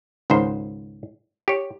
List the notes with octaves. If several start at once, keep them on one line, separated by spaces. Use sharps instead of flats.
C#2 G#2 D#3 C5
G4 C#5